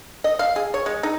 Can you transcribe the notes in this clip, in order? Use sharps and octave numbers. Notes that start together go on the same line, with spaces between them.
D#5
F5
G#4
C#5
G#3
D#4